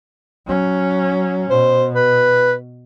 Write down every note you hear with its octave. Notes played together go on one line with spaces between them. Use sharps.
F#3 C#4
B2 C5
B4